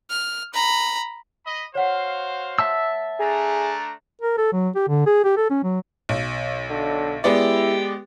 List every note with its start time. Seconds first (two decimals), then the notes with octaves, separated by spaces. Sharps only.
0.10 F6
0.53 A#5 B5
1.45 D#5 B5
1.75 F#4 C5 C#5 F5 F#5
2.59 E5 A5 E6
3.20 A3 D4 G#4 A#5
4.21 A#4
4.38 A4
4.52 F#3
4.75 G4
4.88 D3
5.06 G#4
5.24 G4
5.37 A4
5.50 C#4
5.63 F#3
6.09 B1
6.69 D3
7.24 G#3 B3 E4 G4 D5